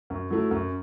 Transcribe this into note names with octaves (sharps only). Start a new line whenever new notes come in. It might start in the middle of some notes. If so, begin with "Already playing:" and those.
F#2
F#3 A3 E4
F#2